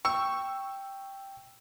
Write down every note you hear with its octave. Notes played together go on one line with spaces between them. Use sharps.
G5 C#6 E6